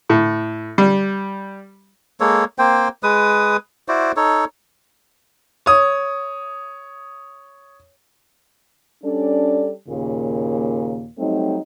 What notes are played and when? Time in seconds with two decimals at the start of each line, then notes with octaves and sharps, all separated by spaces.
0.10 A2
0.78 G3
2.20 G#3 A#3 A4 C#5
2.59 A#3 C4 C5 G5
3.03 G#3 B4 D#6
3.88 E4 F#4 C5 D5
4.17 D#4 A4 C#5
5.66 C#5 D#6
9.04 G3 C#4 D4 A4 D5
9.89 D#2 A#2 C#3 A#3
11.18 F#3 G3 A3 C4 D#4